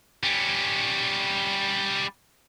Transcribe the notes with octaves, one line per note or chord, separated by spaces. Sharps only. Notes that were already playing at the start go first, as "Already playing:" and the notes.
G3 C#4